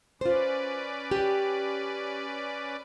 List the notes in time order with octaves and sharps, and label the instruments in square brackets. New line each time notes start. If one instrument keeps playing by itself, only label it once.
[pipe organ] C#4 B4 D5 [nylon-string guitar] F4 C5
[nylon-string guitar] G4